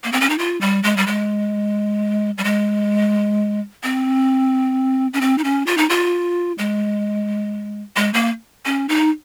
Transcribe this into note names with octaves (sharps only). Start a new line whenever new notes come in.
A#3
C4
C#4
D#4
F4
G3
G#3
G3
G#3
G3
G#3
C4
C#4
C4
D#4
C#4
F4
D#4
F4
G#3
G#3
A#3
C#4
D#4